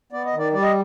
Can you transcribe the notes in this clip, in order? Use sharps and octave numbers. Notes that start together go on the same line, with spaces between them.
B3 D5
D#5
D#3
D5
G3 D5
D#5